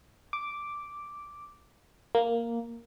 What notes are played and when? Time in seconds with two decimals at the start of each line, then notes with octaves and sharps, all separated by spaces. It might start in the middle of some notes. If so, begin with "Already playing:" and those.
0.33 D6
2.15 A#3